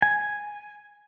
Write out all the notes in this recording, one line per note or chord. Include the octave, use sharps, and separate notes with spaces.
G#5